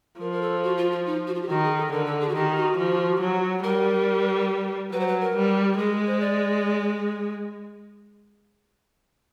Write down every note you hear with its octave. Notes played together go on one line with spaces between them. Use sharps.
F3 A#4
A#4
A4
F#4
F4
F4
D#4
F#4
F4
G4
D#3 F#4
G#4
A4
D3 A#4
A4
G#4
F#4
D#3 G4
F#4
F3
F#3
G3 A#4
F#3 B4
C5
B4
A#4
G3
G#3 G#4
C5
D5